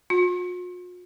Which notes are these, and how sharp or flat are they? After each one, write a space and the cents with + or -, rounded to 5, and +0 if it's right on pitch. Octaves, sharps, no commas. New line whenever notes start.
F4 +45